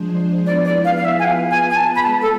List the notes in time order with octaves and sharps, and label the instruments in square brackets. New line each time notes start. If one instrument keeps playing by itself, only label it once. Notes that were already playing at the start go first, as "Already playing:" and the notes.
Already playing: [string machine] F3 G#3 D4 G#4 C5
[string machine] F3 B3 E4 G#4 B4 [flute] D5
[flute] D5
F5
F5
E5
G#5
[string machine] B3 F4 G#4 B4 [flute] F5
[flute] G#5
G#5
A5
B5
[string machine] G#3 B3 F4 G#4 [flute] A5
[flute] A4